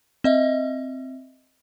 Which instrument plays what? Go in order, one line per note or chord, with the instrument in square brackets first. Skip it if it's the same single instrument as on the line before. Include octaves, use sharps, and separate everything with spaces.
[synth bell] C4 D#5 E5